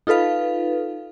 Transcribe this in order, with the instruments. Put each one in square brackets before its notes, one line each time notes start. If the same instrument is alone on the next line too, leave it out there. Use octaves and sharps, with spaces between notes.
[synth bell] D#4 F4 A4 B4 F5